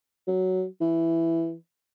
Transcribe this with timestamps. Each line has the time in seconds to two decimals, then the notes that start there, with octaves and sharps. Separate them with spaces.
0.27 F#3
0.81 E3